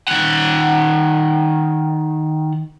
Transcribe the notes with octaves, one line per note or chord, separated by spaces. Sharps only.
D#3 F#5